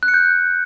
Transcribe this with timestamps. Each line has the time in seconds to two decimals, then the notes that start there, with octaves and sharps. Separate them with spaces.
0.03 F#6
0.08 C#7
0.14 G6